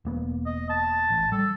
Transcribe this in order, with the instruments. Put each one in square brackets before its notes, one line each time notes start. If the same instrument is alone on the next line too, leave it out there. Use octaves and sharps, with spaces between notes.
[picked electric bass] E1 A#3 B3
[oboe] D#5
A5
[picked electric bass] A1
[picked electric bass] G3 [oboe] A4